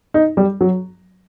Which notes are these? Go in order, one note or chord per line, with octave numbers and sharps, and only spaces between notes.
D#4
G3
F#3